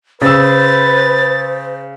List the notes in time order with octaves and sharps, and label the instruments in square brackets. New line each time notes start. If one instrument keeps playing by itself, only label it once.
[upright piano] C#3 E6 [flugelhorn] B4 [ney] C5 [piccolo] A6